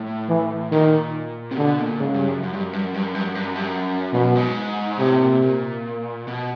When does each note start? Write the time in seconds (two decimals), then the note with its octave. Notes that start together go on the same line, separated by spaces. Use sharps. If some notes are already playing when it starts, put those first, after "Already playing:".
Already playing: A2
0.29 E3
0.72 A#2 D#3
1.51 C3
1.57 B2 D3
1.79 A#2
2.00 G#2 C#3
2.14 G2
2.28 F#2
2.43 F#2
2.53 G2
2.63 F#2
2.73 G2
2.84 F#2
2.94 G2
3.04 F#2
3.15 G2
3.25 F#2
3.35 G2
3.45 F#2
3.55 G2
3.66 F#2
4.13 F#2 B2
4.35 G#2
4.99 A2 C3
5.21 A#2
5.42 A#2
6.28 B2